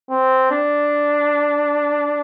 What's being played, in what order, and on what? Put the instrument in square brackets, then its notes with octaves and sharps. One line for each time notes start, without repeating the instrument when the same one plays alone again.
[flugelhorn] C4
D4